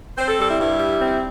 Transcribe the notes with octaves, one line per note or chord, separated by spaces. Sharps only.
C4 C5
A4
G3 A4
E4
G2 E4
G3
C4